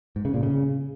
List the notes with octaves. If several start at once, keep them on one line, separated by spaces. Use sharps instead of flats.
G#2
C#3
A#2
C#3